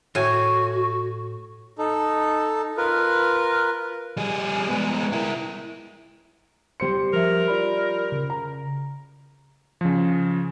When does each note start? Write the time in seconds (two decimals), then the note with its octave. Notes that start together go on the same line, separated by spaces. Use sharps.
0.15 A2 F#4 G#5
1.78 D#4 A4
2.77 F4 A#4 B4
4.17 G3 G#4
4.70 G#3 B3
5.13 E4 A#4
6.80 G3 C5 C6 C#7
7.14 F3 A#4 E5
7.48 F4 D5 B5
8.12 C#3
8.30 A#5
9.81 C#3 F3